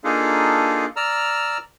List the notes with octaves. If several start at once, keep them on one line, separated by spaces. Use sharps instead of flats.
A#3 D4 D#4 F4 G#4 A4
D5 A#5 E6 F6